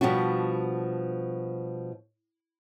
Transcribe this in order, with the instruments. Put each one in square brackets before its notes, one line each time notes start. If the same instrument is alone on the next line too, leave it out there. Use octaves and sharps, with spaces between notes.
[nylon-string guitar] B2 F3 G3 D4 F#4